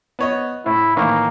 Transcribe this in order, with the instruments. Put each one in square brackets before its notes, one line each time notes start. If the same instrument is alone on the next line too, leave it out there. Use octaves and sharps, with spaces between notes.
[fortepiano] B3 C#5 D#5
[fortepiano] A2 [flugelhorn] E4
[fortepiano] A2 D#3 E3 [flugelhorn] A#3